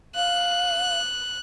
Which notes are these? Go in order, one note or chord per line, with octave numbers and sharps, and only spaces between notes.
F5 F#6